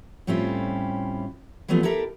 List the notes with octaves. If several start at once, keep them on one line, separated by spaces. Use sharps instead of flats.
A2 G3 C4 C#4 E4 F4
E3 F#3 G3 A3 B3 F4
E4 G4 A4 A#4 E5